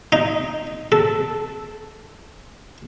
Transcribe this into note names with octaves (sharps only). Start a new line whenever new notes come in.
D#4
A4